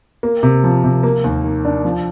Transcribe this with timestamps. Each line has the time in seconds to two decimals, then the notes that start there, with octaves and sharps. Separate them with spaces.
0.23 A#3
0.43 C3
0.64 F3
0.84 C3
1.03 A#3
1.24 D#2
1.44 D#3
1.65 D4
1.85 F3